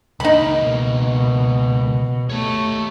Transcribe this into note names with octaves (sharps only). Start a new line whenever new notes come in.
C#2 A#3 D#4 B5
B2
A3 G4 C#5